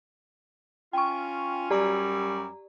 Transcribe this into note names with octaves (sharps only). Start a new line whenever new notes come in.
C#4 F4 G5 C#6
F#2 F#3 G3 G4 D5 A#5